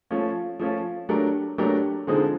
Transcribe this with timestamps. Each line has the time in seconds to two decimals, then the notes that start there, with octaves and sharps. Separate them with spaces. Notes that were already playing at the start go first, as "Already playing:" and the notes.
0.11 F3 A3 C#4 F4
0.59 F3 A3 C#4 F4
1.09 F#3 A3 D4 G4 A#4
1.58 F#3 A3 D4 G4 A#4
2.07 D3 F3 G#3 C4 D#4